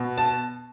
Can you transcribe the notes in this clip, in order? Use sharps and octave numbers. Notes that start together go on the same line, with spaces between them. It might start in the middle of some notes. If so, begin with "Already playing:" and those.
Already playing: B2 B3
A5